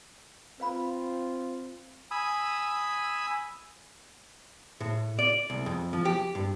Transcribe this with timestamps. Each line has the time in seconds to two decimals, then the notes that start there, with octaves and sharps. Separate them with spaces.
0.60 C4 F4 B4 F5 B5
2.11 G#5 B5 D#6 E6
4.80 A2
5.19 D5
5.50 C2
5.66 F2
5.93 F3
6.05 G4
6.35 G2